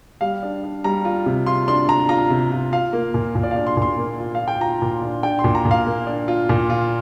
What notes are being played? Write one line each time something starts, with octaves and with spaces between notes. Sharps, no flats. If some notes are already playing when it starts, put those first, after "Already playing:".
G3 F5
D4
D4
G3 A#5
F4
C3
F4 C6
D4 C6
D4 A#5
F4 A#5
C3
F4
F4 F5
A#3
A#2
A#2
D5
D4 F5
C6
A#2
C6
A#3
F4
F5
F4
G5
F4 A#5
A#2
D4
D4 G5
C6
A#2
A#5
A#2
F5
A#3
D4
F4
A#2
F4